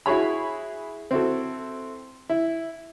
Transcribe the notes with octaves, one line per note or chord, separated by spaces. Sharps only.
E4 F#4 G#4 C#5 B5
C4 E4 F#4 A4
E4